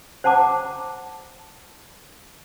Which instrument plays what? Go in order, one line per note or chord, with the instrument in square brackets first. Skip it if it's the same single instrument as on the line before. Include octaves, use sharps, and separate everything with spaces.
[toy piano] C5 F#5 A5 A#5 D6